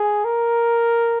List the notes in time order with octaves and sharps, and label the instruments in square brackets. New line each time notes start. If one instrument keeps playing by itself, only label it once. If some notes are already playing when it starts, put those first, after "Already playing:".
Already playing: [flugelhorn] G#4
A#4